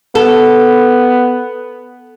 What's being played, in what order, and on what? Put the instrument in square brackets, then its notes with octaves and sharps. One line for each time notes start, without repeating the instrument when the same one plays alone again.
[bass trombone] B3 [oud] A4